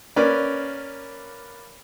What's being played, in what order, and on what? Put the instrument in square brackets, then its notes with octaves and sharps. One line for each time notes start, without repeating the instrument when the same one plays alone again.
[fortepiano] A#3 C#4 B4 D5